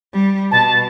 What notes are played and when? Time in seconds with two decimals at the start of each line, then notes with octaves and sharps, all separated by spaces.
0.13 G3
0.51 B2 A5